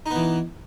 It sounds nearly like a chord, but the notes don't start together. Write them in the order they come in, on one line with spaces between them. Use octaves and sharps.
D#4 B3 E3